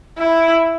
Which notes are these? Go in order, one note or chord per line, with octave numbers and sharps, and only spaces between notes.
E4